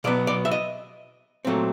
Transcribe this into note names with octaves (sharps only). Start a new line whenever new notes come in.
B2 F#3 B3 D5
D5
E5
D#5
A#2 F#3 A3 C4